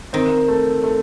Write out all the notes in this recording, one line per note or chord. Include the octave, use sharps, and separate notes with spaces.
D#3 C4
A3
A3